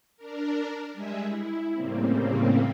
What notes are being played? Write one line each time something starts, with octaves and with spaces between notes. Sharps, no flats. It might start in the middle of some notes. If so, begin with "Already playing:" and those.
D4 A#4
G3 G#3 G#4 E5
E4
A2 C#3 G3 A#3 C4